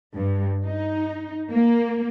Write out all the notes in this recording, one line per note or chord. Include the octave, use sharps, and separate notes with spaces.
G2
D#4
A#3